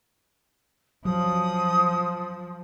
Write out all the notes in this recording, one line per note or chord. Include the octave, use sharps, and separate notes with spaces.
F3 F#3 D#6